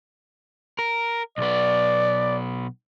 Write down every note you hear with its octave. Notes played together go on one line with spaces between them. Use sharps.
A#4
B1 B3 D5